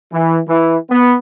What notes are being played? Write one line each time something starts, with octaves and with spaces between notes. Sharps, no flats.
E3
E3
B3